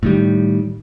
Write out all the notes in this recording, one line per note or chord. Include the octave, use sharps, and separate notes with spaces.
A2 D#3 G3